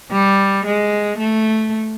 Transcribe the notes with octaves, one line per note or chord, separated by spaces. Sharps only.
G3
G#3
A3